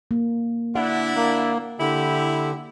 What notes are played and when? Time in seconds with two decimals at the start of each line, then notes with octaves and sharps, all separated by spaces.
0.11 A#3
0.75 D3 D4 E4 F#5
1.15 A#3
1.80 D3 E4 G4